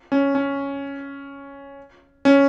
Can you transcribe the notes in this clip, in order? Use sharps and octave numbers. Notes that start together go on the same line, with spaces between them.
C#4
C#4
C#4